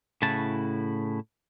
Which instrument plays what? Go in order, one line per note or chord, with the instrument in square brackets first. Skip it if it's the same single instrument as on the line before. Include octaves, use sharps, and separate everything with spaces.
[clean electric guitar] A2 C#3 E4 F#4 A5